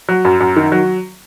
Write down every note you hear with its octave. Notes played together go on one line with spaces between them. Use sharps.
F#3
F#2
F#2
D#3
F#3